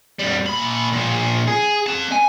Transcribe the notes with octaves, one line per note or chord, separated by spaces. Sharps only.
F2 G3
A#2 B5
A#2 F3
G#4
C4 A5
G#5